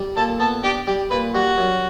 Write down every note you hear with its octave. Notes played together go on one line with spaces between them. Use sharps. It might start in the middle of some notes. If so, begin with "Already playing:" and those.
Already playing: G3
A#2 A4
B3 A4
D4 G4
G3 G4
A#2 B4
G3 F#4
F#2